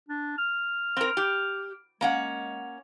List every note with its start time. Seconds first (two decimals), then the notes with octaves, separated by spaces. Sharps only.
0.09 D4
0.38 F6
0.97 C4 A#4
1.17 G4
2.01 G#3 A#3 C#4 F#5